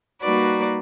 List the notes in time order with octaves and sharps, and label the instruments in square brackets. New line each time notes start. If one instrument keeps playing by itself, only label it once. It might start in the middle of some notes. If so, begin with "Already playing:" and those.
[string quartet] G3 A#3 D#4 F#4 B4 D5